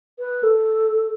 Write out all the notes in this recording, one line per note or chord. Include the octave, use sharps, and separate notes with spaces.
B4
A4